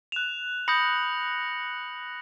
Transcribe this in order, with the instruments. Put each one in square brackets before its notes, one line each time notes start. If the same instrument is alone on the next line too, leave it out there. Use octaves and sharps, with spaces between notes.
[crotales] F#6 F7 [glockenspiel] E7
[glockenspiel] B5 D#6 G6 [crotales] A#6 C#7 F#7